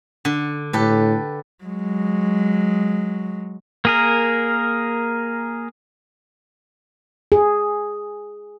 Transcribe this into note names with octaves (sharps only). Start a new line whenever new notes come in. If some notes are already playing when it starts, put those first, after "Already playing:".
D3
A2 G4 A4 B4
F#3 G#3
A#3 G#4 A#4
G#4